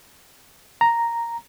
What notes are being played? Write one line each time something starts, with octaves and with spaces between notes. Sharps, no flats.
A#5